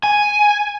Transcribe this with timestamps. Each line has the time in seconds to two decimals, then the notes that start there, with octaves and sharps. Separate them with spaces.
0.03 G#5